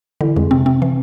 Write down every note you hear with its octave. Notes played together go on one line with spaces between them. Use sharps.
D3 E3
F2 G#3
C3 C4
C4
E3